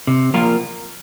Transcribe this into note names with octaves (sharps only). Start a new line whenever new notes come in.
C3
F3 A#3 F4 A#4